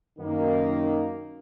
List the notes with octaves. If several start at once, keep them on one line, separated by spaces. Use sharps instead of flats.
F#2 D#3 A#3